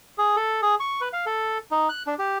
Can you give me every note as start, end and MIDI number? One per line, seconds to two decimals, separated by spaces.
0.18 0.36 68
0.36 0.61 69
0.62 0.75 68
0.80 1.01 85
1.01 1.09 71
1.13 1.25 77
1.26 1.58 69
1.71 1.89 63
1.89 2.03 90
2.07 2.14 62
2.19 2.38 67